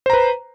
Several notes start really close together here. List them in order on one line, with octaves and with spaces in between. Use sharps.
C5 A#5 B4